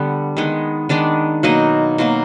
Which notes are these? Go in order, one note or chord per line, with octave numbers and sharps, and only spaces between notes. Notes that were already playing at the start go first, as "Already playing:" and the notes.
Already playing: D3 G3 B3 D4
D#3 G#3 B3
D#3 G#3 B3 D4 D5
B2 F#3 A#3 D#4 D#5
B2 F#3 A#3